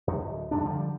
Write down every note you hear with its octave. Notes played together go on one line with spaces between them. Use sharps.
F2
D1
F2 G#2 D4
D3 F3 G3